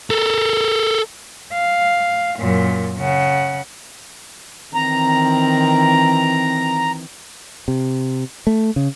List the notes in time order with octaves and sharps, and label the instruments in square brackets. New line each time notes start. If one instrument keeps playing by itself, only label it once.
[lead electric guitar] A4 A#4
[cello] F5
F#2 A#2
C#3 F#5
[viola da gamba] D#3 E3 C4 [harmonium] A#5
[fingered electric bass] C3
A3
C#3